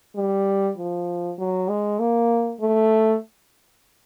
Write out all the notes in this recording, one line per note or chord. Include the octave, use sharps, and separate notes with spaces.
G3
F3
F#3
G#3
A#3
A3